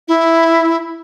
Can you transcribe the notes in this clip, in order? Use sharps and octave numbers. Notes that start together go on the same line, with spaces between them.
E4